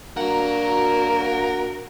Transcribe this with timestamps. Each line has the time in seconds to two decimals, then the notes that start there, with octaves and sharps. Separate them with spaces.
0.17 A#3 D4 F#4 A#4 F#5 A#5